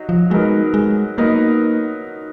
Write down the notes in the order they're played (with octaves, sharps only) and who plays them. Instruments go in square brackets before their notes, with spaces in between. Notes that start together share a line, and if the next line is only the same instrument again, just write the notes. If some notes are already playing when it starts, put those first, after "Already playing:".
Already playing: [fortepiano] F#3 D#4
[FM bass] F3
[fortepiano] F#3 B3 D#4 A#4 [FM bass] G#3
[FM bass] G#3
[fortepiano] F#3 B3 D#4 A#4 [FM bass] A#3